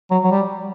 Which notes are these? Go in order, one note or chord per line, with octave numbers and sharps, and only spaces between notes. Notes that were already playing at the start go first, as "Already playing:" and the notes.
F#3
F#3
G3